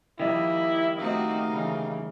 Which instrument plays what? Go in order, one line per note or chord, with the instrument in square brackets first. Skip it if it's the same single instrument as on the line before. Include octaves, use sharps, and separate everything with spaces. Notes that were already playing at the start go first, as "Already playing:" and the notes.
[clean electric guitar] D#3 G3 A#3 [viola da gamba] F3 [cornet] E4 [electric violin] D#5
[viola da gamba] A3 C4 F#4 [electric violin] D#4 F5 [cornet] D#5
[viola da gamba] C#3 E3